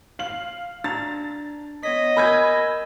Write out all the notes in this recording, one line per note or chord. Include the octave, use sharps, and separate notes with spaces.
F5 F#7
D4 A#5 A6
B3 C#5 D#5 B6
A#4 G#5 B5 E6 G6 G#6